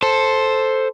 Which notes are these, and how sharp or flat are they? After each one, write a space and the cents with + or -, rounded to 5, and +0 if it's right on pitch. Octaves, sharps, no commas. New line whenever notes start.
A4 +0 C5 +5